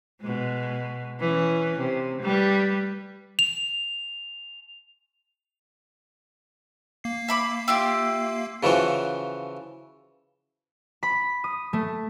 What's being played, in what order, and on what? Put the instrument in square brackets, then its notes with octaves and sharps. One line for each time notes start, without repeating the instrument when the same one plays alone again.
[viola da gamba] B2 G#3
E3 C#4
C3
G3 B4
[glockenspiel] F7
[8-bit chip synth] A#3 C7
[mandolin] E5 B5 D6
E4 F4 G4
[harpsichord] C#3 E3 F3 F#4
[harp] B5
D#6
A3